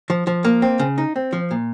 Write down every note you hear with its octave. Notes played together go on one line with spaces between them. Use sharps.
F3
F3
A#3
C4
C#3
D#4
C4
F3
A#2